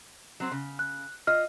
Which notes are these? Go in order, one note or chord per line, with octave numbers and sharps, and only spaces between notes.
F#3 C4 C5
C#3
F#6
F4 D#5 F6